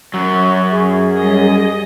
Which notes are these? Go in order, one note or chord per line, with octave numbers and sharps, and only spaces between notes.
F#2 F#3 C#6
G#4
G3 D#5